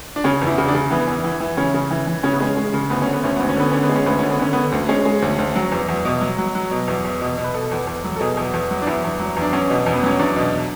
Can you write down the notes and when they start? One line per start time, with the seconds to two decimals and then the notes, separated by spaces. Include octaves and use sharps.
0.16 D4
0.24 C#3 C#4
0.41 E2
0.47 E4
0.58 C#3
0.68 D4
0.74 C#3
0.91 E3 B3
1.07 E2
1.24 E3
1.40 E3
1.57 C#3 C#4
1.74 C#3
1.91 E3
2.07 E3
2.23 C#3 C#4
2.33 B3
2.40 G#3 C#4
2.57 G#3
2.74 C#3
2.90 D2 B3
3.02 D3 C#4
3.13 B3
3.24 D2 C#4
3.36 D2 B3
3.49 C#4
3.57 D3 B3
3.72 D3 C#4
3.83 B3
3.89 G#3
3.96 C#4
4.06 D2 B3
4.19 D3 C#4
4.30 B3
4.39 D3 C#4
4.53 D3 B3
4.72 D2
4.89 G#3 C#4
5.05 G#3
5.22 D2
5.39 D2
5.56 F#3
5.72 E2
5.88 E2
6.05 B2
6.21 F#3
6.38 F#3
6.55 F#3
6.71 B2
6.88 E2
7.05 E2
7.21 B2
7.37 B2
7.44 B4
7.54 B2 A4
7.71 E2
7.87 E2
8.04 F#3
8.16 A4
8.21 B2 G#4
8.37 E2
8.54 E2
8.71 F#3
8.82 D4
8.87 E2 E4
9.04 E2
9.20 F#3
9.36 E2
9.42 D4
9.53 E2 C#4
9.70 B2
9.86 E2
9.93 B3
10.03 F#3 C#4
10.19 E2 D4
10.36 B2